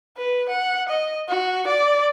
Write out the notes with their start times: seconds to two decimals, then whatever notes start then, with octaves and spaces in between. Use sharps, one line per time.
0.17 B4
0.49 F#5
0.88 D#5
1.28 F#4
1.67 D5